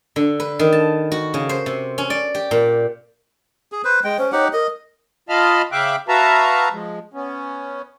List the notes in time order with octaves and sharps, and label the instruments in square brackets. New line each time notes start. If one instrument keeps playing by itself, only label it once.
[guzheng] D3
B4
D#3
A5
F#4
C#3
C5
C3
C#4
D5
G4
A#2
[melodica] G#4
B4 C5
G#3 G5
[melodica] C#4 [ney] C5
[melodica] D#4 G4 F#5 [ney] C#5
[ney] A#4 [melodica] D#5
[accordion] F4 D#5 F5 A5 B5 F6
C#3 E5 F5 G5 D6 F#6
F#4 B4 E5 F5 A5 A#5
F3 G#3
B3 C#4